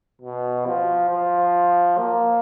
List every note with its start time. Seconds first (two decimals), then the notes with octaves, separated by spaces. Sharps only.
0.22 B2
0.66 F3
1.10 F3
1.98 A#3